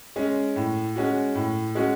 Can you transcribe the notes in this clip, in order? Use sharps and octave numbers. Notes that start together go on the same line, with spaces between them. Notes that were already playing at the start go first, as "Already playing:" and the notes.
G#3 C#4
A2
G#3 C#4 F#4
A2
G#3 C#4 F#4